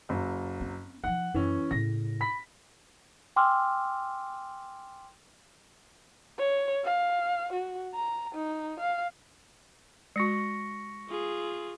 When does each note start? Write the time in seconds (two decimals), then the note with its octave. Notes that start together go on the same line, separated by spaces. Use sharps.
0.09 F#1 F#3
0.61 C4
1.04 F3 D#4 F#5
1.34 F#2 E3 C#4
1.71 A2 C#3 A#6
2.21 B5 B6
3.36 G5 G#5 C6 D6 E6 F6
6.39 C#5
6.84 F5
7.53 F#4
7.95 A#5
8.35 D#4
8.80 F5
10.16 G#3 F#4 C#6 A#6 C#7
11.09 F4 G#4